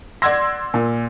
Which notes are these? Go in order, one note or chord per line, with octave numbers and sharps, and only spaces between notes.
D5 F#5 C6 E6 G#6 A#6
A#2